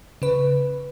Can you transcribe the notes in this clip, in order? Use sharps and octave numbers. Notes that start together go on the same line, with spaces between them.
C#3 B4